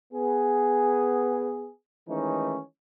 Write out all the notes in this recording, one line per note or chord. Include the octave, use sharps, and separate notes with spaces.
B3 G#4
D#3 E3 G#3 A3 C#4 D#4